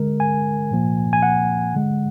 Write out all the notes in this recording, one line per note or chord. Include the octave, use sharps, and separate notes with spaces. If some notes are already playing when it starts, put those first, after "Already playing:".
Already playing: D3 G#3 A#4
G#5
A#2 F3 A#3
G#5
F#5
D3 G#3